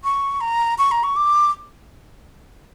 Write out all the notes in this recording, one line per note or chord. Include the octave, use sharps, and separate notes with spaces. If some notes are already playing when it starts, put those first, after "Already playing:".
C#6
A#5
C#6
A#5
C#6
D6